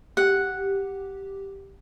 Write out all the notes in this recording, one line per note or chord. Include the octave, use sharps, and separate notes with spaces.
G4 F#5